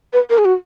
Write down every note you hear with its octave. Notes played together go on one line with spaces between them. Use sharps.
B4
A#4
G#4
F#4